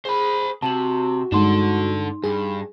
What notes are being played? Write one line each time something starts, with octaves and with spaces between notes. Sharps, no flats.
G#4 C5 B5
C3 F#4 A5 F#7
G2 G#3 D4 D#4 A4 C6
G2 G#4